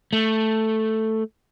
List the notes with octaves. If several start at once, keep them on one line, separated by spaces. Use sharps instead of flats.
A3